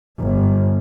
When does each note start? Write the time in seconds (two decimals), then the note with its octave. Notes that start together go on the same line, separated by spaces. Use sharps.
0.20 G1